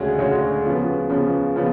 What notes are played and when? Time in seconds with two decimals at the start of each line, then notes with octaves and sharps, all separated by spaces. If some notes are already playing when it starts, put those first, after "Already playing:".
Already playing: D2 C#3 G#3 C#4 F#4
0.19 D2 C#3 G#3 C#4 F#4
0.65 C#3 F3 B3
1.10 C#3 F3 B3
1.56 C#3 F3 B3